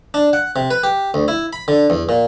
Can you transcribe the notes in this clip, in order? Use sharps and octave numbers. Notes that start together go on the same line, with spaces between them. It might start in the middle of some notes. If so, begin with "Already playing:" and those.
D4
F#5
C3
B4
G4
D2
E4
B5
D3
E2
A#2